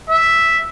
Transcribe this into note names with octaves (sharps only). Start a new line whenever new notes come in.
E5